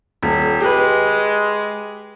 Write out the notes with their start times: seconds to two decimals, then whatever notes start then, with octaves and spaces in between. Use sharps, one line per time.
0.23 D#1
0.61 G#3 G4 B4